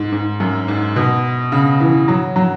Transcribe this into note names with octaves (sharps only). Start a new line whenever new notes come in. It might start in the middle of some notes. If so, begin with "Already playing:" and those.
Already playing: G#2
G#2
F#2
G#2
B2
C#3
E3
F#3
F#3